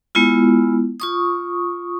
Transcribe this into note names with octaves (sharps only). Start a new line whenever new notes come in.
G#3 B3 E4 F4
F4 C#6 D#6